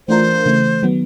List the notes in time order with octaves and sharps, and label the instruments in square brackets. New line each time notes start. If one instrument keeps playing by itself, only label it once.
[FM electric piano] E3 A3 D4 F4 A#4 [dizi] C5
[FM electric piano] C#3 E3 A3
D#3 F#3 B3